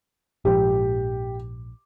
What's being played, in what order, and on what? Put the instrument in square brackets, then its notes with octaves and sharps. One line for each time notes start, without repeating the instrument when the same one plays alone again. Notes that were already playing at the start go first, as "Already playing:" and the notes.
[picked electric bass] A#1 G#2 F3 [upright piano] G4